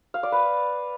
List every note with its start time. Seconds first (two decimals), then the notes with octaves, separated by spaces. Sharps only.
0.14 F5
0.23 D5
0.32 B4